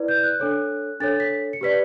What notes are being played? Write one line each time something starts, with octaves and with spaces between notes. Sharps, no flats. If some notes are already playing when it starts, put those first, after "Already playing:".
Already playing: E4 B4 D5
G6
F#6
D4 A4 C#5
D4 A4 C#5 A6
B6
C#7
G4 B4 D5 B6